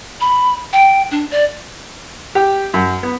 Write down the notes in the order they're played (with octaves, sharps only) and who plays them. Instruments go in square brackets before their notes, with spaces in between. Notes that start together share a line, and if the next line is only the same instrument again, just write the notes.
[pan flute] B5
G5
D4
D5
[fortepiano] G4
F#2
B3